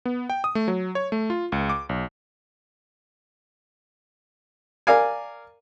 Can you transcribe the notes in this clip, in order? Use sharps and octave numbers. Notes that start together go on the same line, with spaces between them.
B3
G5
D#6
A3
F#3
C#5
A3
F4
C#2
D6
B1
A#4 D5 F5 G#5